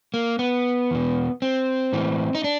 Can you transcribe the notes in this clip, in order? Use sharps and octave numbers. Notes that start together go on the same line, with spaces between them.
A#3
B3
E2 B2
C4
A2 E3
D#4
D4